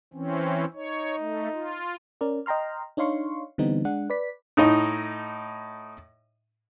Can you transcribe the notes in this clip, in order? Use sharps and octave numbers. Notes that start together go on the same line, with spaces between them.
E3 C4 C#4
D#4 C#5
A3
F4
C#4 A#4 D5
D#5 G5 A#5 C6 F6
D4 D#4 C#5 F5 C6 C#6
D3 E3 G3 B3 C4 D#4
G#3 D4 F#5
B4 D5 B6
A2 D#4 D#5